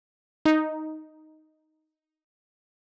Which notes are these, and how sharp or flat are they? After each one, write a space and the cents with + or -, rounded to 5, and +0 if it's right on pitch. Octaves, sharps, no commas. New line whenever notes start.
D#4 +0